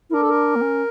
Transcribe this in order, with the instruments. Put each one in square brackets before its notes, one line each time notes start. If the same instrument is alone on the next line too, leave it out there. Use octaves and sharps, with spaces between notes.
[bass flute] E4
[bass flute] D4 [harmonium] A#4
[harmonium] A4
A#4
[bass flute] A#3
C#4